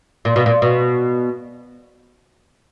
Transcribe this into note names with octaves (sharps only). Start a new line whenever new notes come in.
A#2
B2
A#2
B2